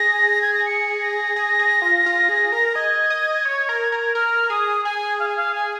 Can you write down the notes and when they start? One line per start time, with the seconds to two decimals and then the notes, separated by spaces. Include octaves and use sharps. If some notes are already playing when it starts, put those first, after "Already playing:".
Already playing: G#4 A#6
0.42 G#6
0.54 A#6
0.66 C#7
1.01 A#6
1.36 G#4
1.59 G#4
1.82 F4
2.06 F4
2.29 G#4
2.52 A#4
2.75 D#5 G#6
3.10 D#5
3.45 C#5
3.69 A#4
3.92 A#4
4.15 A#4 F6
4.50 G#4 D#6
4.85 G#4 G#5
5.20 F5
5.29 G#5
5.37 F5
5.55 G#5